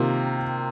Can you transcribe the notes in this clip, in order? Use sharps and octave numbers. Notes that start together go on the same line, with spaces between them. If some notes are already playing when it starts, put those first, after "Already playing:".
Already playing: C3 D#3 A#3 F4